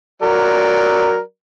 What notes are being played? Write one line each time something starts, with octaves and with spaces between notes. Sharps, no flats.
F#3 A#4 D5